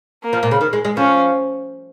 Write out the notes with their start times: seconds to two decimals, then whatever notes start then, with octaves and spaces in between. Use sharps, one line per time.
0.23 A#3
0.33 F3
0.43 A#2
0.51 C#3
0.61 D#3
0.73 G#3
0.85 G#3
0.97 F3 C#4